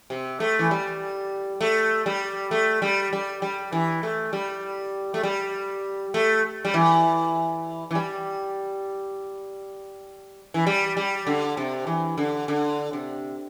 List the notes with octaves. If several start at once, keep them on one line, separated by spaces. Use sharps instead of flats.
C3
A3
E3
G3
A3
G3
A3
G3
G3
G3
E3
A3
G3
A3
G3
A3
G3
E3
E3
G3
E3
G3
G3
D3
C3
E3
D3
D3
C3